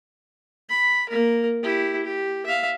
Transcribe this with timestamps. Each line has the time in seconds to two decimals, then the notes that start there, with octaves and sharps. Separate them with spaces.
0.69 B5
1.09 A#3 A#4
1.63 E4 G4
2.05 G4
2.46 E5 F5